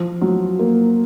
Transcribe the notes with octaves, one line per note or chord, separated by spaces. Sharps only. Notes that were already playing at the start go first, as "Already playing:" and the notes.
Already playing: F3
F#3
A#3